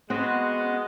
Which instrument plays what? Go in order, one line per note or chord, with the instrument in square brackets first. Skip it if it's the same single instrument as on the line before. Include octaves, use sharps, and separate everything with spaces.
[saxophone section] G#3 [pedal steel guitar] B3 F#4 F#5 [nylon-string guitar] C4 [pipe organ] D#5